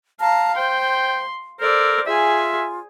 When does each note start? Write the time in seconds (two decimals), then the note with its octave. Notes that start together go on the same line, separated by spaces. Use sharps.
0.20 F5 A5 A#5
0.57 C5 G5 C6
1.60 A4 A#4 C5 D5
2.07 F4 G#4 E5 G#5